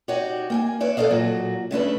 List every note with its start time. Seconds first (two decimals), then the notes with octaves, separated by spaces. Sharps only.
0.08 D#4 F#4 G4 C#5 D5
0.50 A#3 G5 G#5
0.80 B4 C#5 D5 E5
0.97 A4 C5 D5 D#5 F5
1.11 A#2 F#3 F#4
1.71 C#3 A3 D4 B4